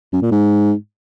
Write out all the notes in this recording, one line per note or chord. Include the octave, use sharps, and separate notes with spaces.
F#2
A#2
G#2